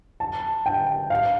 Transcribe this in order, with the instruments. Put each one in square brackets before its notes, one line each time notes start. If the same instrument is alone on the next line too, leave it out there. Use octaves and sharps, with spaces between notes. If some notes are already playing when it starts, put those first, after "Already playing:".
[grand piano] A5
G5
F5